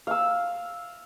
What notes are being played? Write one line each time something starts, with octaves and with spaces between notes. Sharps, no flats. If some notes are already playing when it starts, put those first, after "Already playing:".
F5 E6